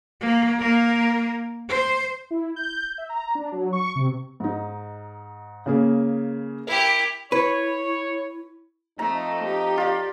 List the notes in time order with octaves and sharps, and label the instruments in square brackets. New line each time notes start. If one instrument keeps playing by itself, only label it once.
[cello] A#3
A#3 A#4
C5
[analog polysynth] E4
G6
E5
A#5
D4
F#3
C#6
C3
[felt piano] G#2 D#4
C#3 A#3 G#4
[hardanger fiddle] E4 G4 [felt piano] A#4
[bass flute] E4 [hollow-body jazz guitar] B4 [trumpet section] C#5
[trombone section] F2 C4 D#4 [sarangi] A3 [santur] A#5
[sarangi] G4
[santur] F4 D5